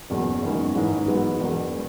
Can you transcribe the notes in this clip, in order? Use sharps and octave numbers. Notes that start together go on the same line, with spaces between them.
F#1 E2 B2 F#3 C#4
F#1 E2 D#3 G#3 C#4
G#2 E3 G#3 D#4
G#2 F#3 B3
E1 E2 B2
G#3